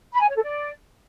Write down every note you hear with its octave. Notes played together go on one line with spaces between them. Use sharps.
B5
G#5
C#5
A4
D5